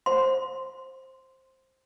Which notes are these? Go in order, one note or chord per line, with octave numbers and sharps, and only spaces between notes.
C5 C6